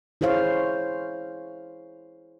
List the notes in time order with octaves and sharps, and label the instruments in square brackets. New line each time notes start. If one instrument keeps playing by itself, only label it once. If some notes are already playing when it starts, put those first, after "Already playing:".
[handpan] E4 G#4 C5 C#5 F5